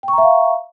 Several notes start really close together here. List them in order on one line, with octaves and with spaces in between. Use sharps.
G5 C#6 A#5 E5 F5